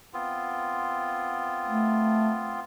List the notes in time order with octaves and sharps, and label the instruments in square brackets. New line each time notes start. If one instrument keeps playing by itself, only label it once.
[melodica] B3 C4 F4
[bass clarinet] A3